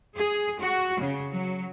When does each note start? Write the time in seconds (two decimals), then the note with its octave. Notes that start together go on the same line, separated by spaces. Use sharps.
0.16 G#4
0.61 F#4
1.00 C#3
1.34 F#3